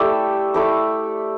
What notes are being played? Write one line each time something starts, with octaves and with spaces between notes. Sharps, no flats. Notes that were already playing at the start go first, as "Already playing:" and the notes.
Already playing: A3 E4 G4 A4 D5 E5
A3 E4 D6